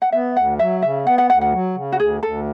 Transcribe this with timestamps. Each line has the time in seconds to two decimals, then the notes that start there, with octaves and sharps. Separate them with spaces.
0.02 F#5
0.12 B3 E5
0.36 D2 F#5
0.59 F#3 E5
0.82 C#3 E5
1.06 B3 F#5
1.18 F#5
1.30 D2 F#5
1.41 F#5
1.53 F#3
1.75 C#3
1.92 F#4
1.99 D2 G#4
2.23 D2 A4